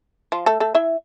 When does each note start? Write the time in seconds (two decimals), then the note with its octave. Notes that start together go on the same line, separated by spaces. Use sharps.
0.32 F3 F4
0.46 A3 A4
0.60 A3 A4
0.75 E4 E5